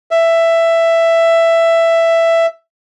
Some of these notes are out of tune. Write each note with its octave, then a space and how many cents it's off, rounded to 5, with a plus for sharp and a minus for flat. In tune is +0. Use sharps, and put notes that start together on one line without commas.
E5 +10